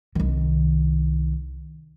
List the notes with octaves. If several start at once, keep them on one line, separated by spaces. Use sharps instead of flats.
C2 D#3